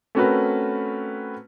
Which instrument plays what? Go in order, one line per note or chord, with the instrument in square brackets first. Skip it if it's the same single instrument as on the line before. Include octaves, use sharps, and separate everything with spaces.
[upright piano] A3 C4 C#4 F#4 A#4 B4